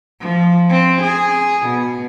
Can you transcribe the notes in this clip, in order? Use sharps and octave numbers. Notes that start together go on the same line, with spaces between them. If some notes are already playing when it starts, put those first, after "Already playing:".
F3
C4
G#4
B2